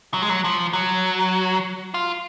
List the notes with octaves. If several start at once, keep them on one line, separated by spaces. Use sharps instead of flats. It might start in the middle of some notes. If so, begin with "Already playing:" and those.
F#3
G#3
F#3
F3
F#3
F4